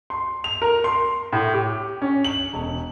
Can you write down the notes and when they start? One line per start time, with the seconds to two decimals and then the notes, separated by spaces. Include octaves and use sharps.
0.10 C6
0.44 F7
0.62 A#4
0.84 C6
1.33 A2
1.54 G4
2.02 C#4
2.24 F#7
2.53 E1